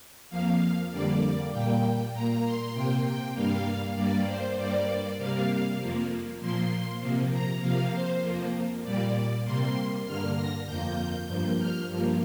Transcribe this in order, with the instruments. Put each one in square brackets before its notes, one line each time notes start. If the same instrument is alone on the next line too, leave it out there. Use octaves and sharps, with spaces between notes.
[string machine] F2 F3 A#3 F5
F2 D3 G3 A#3 D5
A#2 G3 A#3 G5
A#2 A#3 A#5
C6
C3 A#3 G5
G5
G2 G3 A#3 F5
G2 G3 A#3 D5
C5
G2 G3 A#3 D5
C3 G3 A#3 F5
F2 F3 A#3
A#2 F3 A#3 C6
C3 F3 A#3
A#5
C3 F3 A#3 F5
C5
F2 F3 A#3
A#2 G3 A#3 D5
C3 G3 A#3 C6
G2 D3 A#3 F6
A#6
F2 F3 A#3 G6
G2 F3 A#3 G6
F6
G2 F3 A#3